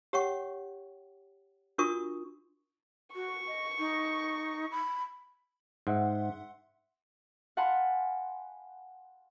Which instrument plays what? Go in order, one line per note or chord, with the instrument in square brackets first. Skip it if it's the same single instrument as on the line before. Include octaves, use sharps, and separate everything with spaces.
[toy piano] G4 C#5 F#5 G5 C#6
D4 F4 F#4 A#4 C#6 D#6
[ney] F#4 [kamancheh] C#6
[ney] D#5
D#4
B5
[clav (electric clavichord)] G#2 [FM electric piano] E5 F#5 C6
[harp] F5 F#5 G#5 A5 B5 C6